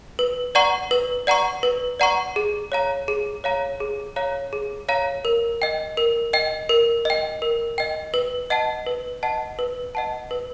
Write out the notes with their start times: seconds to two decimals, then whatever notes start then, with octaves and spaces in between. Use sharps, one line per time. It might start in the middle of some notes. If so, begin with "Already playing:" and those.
0.19 B4
0.55 D5 F#5 A#5 C#6
0.91 B4
1.27 D5 F#5 A#5 C#6
1.63 B4
2.00 D5 F#5 A#5 C#6
2.36 G#4
2.72 C#5 F5 A#5
3.08 G#4
3.44 C#5 F5 A#5
3.80 G#4
4.16 C#5 F5 A#5
4.53 G#4
4.88 C#5 F5 A#5
5.25 A#4
5.62 D#5 G5
5.97 A#4
6.33 D#5 G5
6.69 A#4
7.05 D#5 G5
7.42 A#4
7.78 D#5 G5
8.14 B4
8.50 D#5 F#5 A5
8.87 B4
9.23 D#5 F#5 A5
9.59 B4
9.95 D#5 F#5 A5
10.31 B4